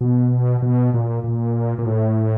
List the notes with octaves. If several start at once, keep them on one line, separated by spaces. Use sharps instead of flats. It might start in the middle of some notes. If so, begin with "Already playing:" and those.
B2
B2
A#2
A#2
A#2
A2